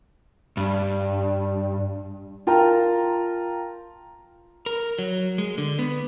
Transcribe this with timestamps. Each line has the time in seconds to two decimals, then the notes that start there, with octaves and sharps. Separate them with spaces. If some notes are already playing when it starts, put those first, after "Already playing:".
0.57 G2
2.47 F4 A#4 G5 A5 A#5
4.66 A#4
4.99 F#3
5.38 G#3
5.58 D3
5.79 B3